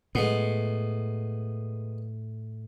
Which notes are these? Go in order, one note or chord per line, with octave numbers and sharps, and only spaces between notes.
A2 G#3 B3